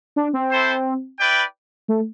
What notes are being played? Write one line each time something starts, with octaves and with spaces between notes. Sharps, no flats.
D4
C4
E4 A4 C5
E4 B4 D5 G5
A3